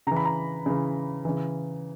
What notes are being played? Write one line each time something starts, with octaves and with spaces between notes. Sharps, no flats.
C#3 E3 A#5
B5
A#5
C#3 E3
C#3 E3